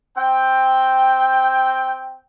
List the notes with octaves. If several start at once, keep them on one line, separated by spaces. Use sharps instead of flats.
C4 G5